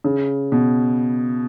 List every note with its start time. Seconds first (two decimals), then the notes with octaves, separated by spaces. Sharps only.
0.04 C#3
0.52 B2